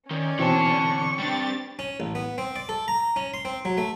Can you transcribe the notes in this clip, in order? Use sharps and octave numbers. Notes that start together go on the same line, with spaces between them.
D#3 C#4 D5
B2 D3 E3 C4 A5 C#6
G3 C4 D4 G4 A6
C#4
A1
B3
C4
D5
A4
A#5
C#4
C6
C4
F#3
A3